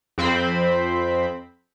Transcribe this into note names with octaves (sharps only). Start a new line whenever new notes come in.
F2 C4 C5 B5